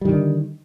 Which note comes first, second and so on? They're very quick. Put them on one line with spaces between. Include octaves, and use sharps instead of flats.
G3 D#3 D3